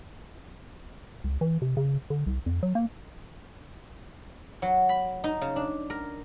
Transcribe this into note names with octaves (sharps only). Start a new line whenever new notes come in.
C#2
E3
C3
C#3
D3
C2
F2
F#3
A#3
F#3
B5
D#4
C#3
D4
A#4